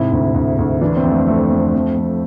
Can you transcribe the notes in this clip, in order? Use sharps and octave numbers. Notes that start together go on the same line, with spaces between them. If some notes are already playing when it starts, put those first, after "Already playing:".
Already playing: G#2 C3 E4
D2
D2
D2
E3 D4
C4
F2
A3
F2 A3
F2
F2
F2